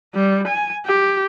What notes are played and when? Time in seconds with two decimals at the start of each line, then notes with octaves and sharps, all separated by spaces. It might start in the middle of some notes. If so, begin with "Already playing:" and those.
0.15 G3
0.48 G#5
0.86 G4